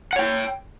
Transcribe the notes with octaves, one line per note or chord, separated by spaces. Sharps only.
C#5 F#5 G5